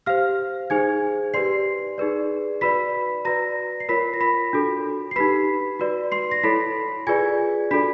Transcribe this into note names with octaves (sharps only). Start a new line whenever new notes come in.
G4 C5 F5 F6
D#4 G#4 C5 G#5 G#6
G4 B4 D5 C6 C7
D#4 G#4 B4 D5
F#4 B4 D5 B5 B6
F#4 B4 D5 A#5 A#6
C7
F4 A#4 C#5 B5 B6
A#6
B5 B6
D4 F#4 A4
C7
D#4 G4 B4 B5 B6
F#4 B4 D5
C6 C7
A#6
E4 A4 C#5 B5 B6
F4 G#4 B4 D5 G#5 G#6
D4 F#4 A4 D5 B5 B6